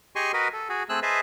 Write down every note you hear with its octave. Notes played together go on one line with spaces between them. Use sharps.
G4 G#4 D#5 G#5 C6 C#6
F#4 A#4 B4 D#5
A4
F#4 G#4
A3 C4 G#4 E6 F#6
G#4 B4 C5 D#5 E5 A5